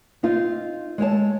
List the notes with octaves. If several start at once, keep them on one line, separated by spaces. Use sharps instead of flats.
C4 D#4 F4
G#3 A4 C#5 A5